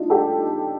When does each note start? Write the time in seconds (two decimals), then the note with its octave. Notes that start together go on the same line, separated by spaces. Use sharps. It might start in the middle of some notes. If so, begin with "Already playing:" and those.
Already playing: D4 D#4 F4
0.10 G4 A4